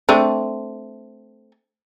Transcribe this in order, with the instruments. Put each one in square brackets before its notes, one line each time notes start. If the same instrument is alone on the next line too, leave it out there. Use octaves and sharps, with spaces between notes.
[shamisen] A3 C4 D4